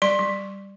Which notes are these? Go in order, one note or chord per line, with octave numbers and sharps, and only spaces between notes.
G3 C6
G3